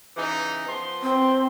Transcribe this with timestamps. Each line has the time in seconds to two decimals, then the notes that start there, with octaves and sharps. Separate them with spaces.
0.16 C#3 E3 D#4
0.67 F3 B3 C6
1.02 C4